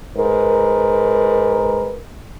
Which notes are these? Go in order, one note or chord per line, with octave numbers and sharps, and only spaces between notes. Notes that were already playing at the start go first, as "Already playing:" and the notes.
G#2 A#4 B4